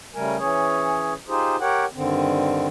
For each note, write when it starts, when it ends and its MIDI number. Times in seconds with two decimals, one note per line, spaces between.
0.15 0.37 49
0.15 0.37 55
0.15 0.37 57
0.15 0.37 70
0.15 0.37 80
0.39 1.14 52
0.39 1.14 61
0.39 1.14 68
0.39 1.14 73
1.28 1.56 63
1.28 1.56 65
1.28 1.56 67
1.28 1.56 68
1.28 1.56 72
1.60 1.85 67
1.60 1.85 70
1.60 1.85 73
1.60 1.85 78
1.60 1.85 79
1.94 2.68 43
1.94 2.68 50
1.94 2.68 51
1.94 2.68 60